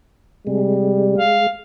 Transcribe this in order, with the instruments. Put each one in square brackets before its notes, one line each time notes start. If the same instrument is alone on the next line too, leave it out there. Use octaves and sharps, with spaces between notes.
[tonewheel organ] C3 G#3 [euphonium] G3
[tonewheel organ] G#3 [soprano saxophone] F5